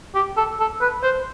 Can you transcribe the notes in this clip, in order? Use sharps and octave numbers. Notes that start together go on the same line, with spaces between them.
G4
A4
A4
B4
C5